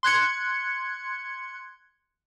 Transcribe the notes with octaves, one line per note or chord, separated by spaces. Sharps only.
C6 F#6 G#6 C#7